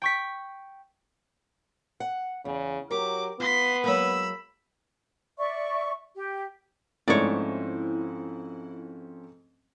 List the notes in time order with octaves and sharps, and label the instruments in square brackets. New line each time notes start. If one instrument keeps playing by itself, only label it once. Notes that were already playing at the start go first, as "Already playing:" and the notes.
[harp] G5 C#6 B6
[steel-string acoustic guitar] F#5
[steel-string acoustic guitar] E2 [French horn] C#3
[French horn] F#3 [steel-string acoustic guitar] G4 A#4 [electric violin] D6
[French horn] B3 [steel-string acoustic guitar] F4 [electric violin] C6 B6
[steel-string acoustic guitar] F#3 G#3 A#3 [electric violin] B5 E6
[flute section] D5 E5 C#6
G4
[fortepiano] G#2 A3 [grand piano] F3 C4 C#4 [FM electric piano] E4 [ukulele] C#5 D5